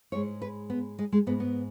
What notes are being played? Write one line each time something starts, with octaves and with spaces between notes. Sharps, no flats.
G#2 G#3 C#5
B4
B3
G#3
G#3
G#2 G#3 B3
B3